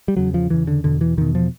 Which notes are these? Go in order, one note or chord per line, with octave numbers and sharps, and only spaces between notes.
G3
E2 C#3 F#3
F3
E2 C#3 E3
D3
E2 B2 D3
E3
E2 B2 D#3
F3